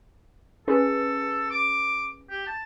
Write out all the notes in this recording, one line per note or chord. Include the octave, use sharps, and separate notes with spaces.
C#4 G#4 A4 B4
D6
G4
A5